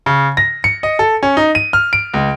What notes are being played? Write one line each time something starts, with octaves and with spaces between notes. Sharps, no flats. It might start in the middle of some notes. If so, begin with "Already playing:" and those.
C#3
A#6
C#7
D#5
A4
C#4
D#4
D#7
F6
D7
C#2